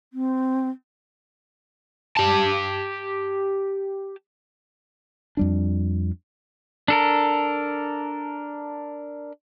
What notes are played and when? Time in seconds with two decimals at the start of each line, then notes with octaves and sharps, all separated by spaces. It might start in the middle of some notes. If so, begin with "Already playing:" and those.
0.13 C4
2.17 G4 A5
5.37 F2 G3 D4
6.88 D4 A4 A#4